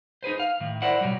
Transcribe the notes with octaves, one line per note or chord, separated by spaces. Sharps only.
D#4 G#4 B4 C5
F5
A2 D#3
E4 A#4 C5 D5 F#5
B2 F#3 G3